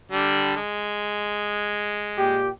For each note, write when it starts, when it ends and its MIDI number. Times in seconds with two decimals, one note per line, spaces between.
0.11 0.55 50
0.11 0.55 55
0.11 0.55 62
0.57 2.39 56
2.18 2.49 46
2.18 2.49 67